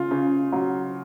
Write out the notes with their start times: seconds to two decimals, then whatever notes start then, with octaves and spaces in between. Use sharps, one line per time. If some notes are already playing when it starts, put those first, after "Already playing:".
Already playing: C#3 F4
0.11 C#3
0.52 F#3